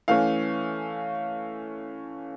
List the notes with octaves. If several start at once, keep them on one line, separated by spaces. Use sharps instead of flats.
E3 A3 C#4 F5